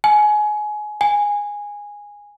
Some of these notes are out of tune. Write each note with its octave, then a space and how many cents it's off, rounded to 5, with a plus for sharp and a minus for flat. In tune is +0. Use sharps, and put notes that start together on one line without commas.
G#5 +20
G#5 -15